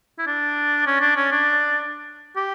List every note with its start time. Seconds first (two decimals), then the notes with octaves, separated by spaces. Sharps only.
0.19 E4
0.27 D4
0.86 C#4
1.01 D4
1.16 C#4
1.32 D4
2.36 G4